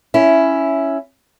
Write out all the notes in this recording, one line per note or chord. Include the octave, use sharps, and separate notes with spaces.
C#4 E4